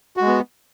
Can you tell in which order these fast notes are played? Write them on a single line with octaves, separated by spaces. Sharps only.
F#4 G#3 B3